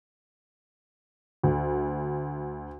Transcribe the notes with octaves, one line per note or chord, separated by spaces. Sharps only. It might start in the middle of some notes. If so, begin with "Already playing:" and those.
D2